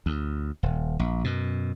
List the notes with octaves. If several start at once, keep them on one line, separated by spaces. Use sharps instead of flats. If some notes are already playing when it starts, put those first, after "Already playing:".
D2
D#1
A#1
F#2 B2